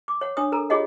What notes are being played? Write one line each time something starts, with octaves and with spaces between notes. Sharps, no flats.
D6
C#5 F#5
D4 C#5 D#6
A4 A#4 A#5
F4 G4 G#4 C#5 D#5 F#5